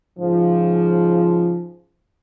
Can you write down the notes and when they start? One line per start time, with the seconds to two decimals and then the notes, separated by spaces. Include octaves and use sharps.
0.19 G#2 C#3 F3